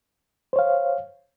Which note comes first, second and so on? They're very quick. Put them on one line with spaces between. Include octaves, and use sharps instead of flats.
C5 C#5 F5